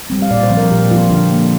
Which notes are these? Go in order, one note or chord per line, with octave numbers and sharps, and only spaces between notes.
G3 C4
F5
A#2 D5
C5
F3 C4
A#4
A#2 G4
F3 C4 F4
D3 D4
A#3